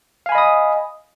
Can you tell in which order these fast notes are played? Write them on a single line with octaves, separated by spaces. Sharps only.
F5 G#5 B5 D#5 D#6